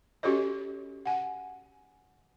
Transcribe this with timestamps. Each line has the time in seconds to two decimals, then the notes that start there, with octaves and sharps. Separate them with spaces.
0.23 C#4 F#4 G4 A4 C#5 D#5
1.06 F#5 G#5